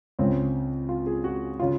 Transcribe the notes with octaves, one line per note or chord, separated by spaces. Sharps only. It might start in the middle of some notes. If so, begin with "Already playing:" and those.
C#2 C#3 C4
F4
G#4
F#4
C#3 F4